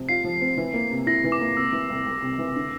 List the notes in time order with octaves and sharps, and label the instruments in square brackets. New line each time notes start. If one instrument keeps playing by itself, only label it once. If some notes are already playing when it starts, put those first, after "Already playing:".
Already playing: [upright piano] C3 F3 C4
[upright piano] F4 [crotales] C7
[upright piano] F3
C4
E3
A#3
C3
[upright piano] E4 [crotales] A#6
[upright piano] E3
[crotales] D6
[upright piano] A#3
[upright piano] C3 [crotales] E6
[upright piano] E3
C2
C2
C3
E3
D3